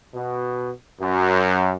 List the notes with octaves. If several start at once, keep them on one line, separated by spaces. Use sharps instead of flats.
B2
F#2